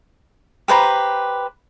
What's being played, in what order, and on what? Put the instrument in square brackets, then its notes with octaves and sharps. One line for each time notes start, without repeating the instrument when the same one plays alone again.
[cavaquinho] G4 B4 C5 A#5